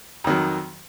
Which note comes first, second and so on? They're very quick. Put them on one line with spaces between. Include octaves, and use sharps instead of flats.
F2 D#3 F#3